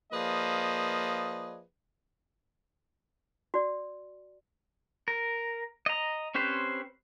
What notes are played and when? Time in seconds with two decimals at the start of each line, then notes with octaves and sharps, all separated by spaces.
0.12 F3 A#3 G#4 B4 D5 D#5
3.54 F#4 D5
5.08 A#4
5.86 D#5 A#5
6.35 C4 C#4 G4 B4 C5